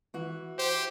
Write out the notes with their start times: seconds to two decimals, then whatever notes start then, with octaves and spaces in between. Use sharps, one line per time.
0.14 E3 F#4
0.58 G4 C5